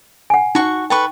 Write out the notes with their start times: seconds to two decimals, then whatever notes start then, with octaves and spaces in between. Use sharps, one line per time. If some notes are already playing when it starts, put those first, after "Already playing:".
0.30 F#5 G#5
0.55 D#4 F#4 F#5 C#6
0.90 A4 B4 G5 C#6